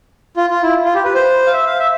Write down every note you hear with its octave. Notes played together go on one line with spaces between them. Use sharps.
F4
F4
E4
F4
G4
B4
C5
F5
E5
F5
E5